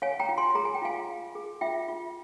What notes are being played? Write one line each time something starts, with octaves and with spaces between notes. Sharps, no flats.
C#5 F5 G#5
G5 A#5
F4
G#5 C6
G#4 A#5
G#5
G5
F4 F5 G#5
F4
G#4
F4 E5 G5
F4